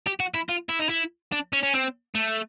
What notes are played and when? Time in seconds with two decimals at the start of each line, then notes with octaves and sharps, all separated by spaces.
0.07 G4
0.20 F#4
0.34 E4
0.49 F4
0.69 E4
0.79 D#4
0.89 E4
1.32 D4
1.53 C#4
1.63 C#4
1.74 C4
2.15 A3